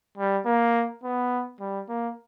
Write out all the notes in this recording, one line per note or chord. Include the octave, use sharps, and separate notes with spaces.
G3
A#3
B3
G3
A#3